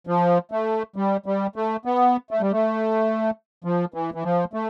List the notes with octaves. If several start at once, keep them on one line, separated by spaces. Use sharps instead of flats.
F3
A3
G3
G3
A3
B3
A3
G3
A3
F3
E3
E3
F3
A3